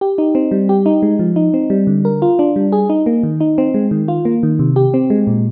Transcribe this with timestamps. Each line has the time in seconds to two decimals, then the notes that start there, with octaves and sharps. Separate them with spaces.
0.01 G4
0.18 D#4
0.35 C4
0.51 G3
0.69 G4
0.86 D#4
1.03 G#3
1.19 F3
1.36 D#4
1.54 C4
1.70 G3
1.87 D3
2.05 A#4
2.22 F4
2.39 D4
2.56 G3
2.72 G#4
2.89 D#4
3.06 A#3
3.23 D#3
3.40 D#4
3.58 C4
3.74 G#3
3.91 D#3
4.08 F4
4.25 A#3
4.43 D#3
4.59 C3
4.76 G4
4.94 C4
5.10 G#3
5.27 A#2